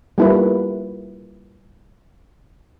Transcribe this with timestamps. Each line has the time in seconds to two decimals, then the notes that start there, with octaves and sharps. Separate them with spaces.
0.18 G3 A#3 E4 F4 B4